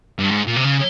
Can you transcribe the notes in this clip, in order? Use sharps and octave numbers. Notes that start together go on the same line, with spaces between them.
G2
G#2
A#2
C3
C#3